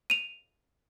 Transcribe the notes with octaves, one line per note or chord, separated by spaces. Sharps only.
D#7 F7